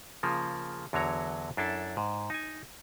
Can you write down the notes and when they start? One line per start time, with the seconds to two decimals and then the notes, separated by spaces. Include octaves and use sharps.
0.23 C#3 F3 A#3
0.93 E2 D3 F#3 C#5 A#5
1.57 F#2 D4 E4 A4 A5
1.97 G#2
2.30 D#4 G#5